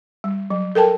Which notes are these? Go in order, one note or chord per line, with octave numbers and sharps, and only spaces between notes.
G3
F#3
A4 A#4 G5 A5